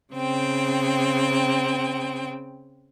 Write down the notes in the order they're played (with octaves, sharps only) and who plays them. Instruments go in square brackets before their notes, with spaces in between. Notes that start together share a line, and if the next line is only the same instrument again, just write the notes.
[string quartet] C#3 C4 G5